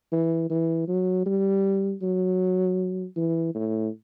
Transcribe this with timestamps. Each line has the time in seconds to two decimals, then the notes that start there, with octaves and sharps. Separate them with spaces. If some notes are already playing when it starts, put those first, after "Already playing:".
0.12 E3
0.50 E3
0.88 F#3
1.26 G3
2.02 F#3
3.17 E3
3.54 A2